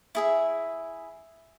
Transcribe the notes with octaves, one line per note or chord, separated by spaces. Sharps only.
E4 G#4 E5